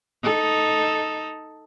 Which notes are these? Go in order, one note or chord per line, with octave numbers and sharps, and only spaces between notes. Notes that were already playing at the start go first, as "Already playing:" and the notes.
D#4 A4